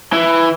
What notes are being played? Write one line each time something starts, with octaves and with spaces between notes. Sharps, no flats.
E3